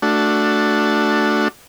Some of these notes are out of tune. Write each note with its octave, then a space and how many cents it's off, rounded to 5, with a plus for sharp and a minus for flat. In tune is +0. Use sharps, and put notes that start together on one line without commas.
A3 +0 D4 +0 F#4 -10